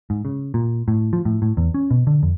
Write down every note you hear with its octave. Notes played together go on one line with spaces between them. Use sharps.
G#2
C#3
A#2
A2
F3
A2
A2
E2
C#4
B2
D3
F2